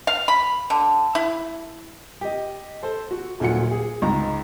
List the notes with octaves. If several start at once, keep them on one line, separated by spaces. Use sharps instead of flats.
F5
B5
D3
E4
G4 D#5
A4 C5
F#4
D#1 A#2 F#3 F4 F#5 C#7
G#4
C#2 G#2 A#5